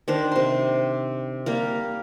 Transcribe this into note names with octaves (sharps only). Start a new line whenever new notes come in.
D#3 D4 C5
C3 C6
G3 A#3 A#4